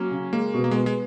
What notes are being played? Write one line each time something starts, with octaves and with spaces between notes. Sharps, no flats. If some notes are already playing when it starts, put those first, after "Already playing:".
Already playing: F#3 A#3 C#4
C#3
G#3 A#3
B2
A#3
G#3 B3
G#3